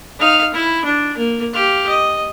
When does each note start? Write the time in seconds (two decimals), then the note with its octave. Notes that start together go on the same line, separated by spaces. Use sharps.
0.19 D#4 F5
0.54 E4
0.85 D4
1.17 A#3
1.54 G4 F5
1.89 D#5